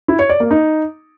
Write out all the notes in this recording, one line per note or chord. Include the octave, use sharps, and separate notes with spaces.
E4
C#5
D5
A#3
D#4